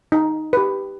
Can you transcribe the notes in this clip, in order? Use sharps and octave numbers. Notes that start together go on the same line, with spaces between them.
D#4
G4 B4